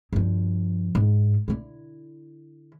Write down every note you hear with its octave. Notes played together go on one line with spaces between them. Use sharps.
G2 F3
G#2
D3 E4